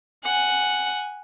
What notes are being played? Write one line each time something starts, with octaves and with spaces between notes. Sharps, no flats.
F#5 G#5